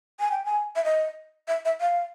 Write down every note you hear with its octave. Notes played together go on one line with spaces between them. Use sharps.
G#5
G5
G#5
E5
D#5
E5
E5
F5